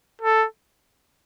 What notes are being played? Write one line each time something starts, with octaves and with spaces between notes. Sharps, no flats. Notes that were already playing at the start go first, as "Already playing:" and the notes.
A4